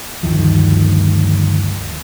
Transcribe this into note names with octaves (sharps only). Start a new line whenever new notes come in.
D2 G2 D#3 F3